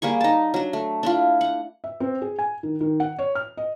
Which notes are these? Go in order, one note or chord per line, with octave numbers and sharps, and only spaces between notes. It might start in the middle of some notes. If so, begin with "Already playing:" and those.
G3 A#3 G#4 C#6
D#4 A5
F#3 D4
A3
D4 E4 F4
F#5
E5
C4
G#4
G#5
D#3
D#3
F#5
C#5
F6
D#5